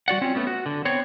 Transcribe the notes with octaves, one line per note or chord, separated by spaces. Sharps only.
G3 F#4 D5 F#5
C4 C#4 F4
A3 B3 C#4
F#4
D3
B3 C4 C#5